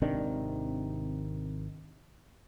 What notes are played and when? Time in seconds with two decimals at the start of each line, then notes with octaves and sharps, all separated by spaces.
0.02 G#1 C3 D#3 D4